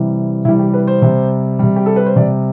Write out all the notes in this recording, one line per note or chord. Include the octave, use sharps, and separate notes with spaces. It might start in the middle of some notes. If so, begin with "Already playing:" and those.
Already playing: C3 E3 G3
C3 E3 G3 E4
G4
B4
C5
C3 G3
C3 G3
G4
A4
B4
C5
C3 G3 D5